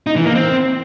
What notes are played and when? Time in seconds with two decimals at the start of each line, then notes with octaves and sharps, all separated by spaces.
0.07 D#4
0.16 E3
0.26 A#3
0.35 C4